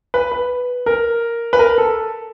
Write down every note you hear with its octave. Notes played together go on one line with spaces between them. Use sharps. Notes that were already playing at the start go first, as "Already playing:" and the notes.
B4
B4
A#4
B4
A#4
A4